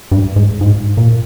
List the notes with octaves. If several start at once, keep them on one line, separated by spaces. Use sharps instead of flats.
G2
G#2
G#2
A#2